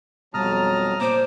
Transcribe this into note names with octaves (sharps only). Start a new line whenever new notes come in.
F2 B2 F#3 G3 A5 A#5 D#6 F6
A#2 A#3 C5 D6